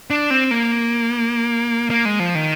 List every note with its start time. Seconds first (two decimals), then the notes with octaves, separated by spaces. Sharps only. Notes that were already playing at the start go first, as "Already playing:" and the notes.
0.10 D4
0.30 C4
0.51 A#3
1.90 A#3
2.05 G#3
2.20 F3
2.35 D#3